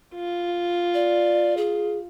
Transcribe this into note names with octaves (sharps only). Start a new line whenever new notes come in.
F4
D5
G#4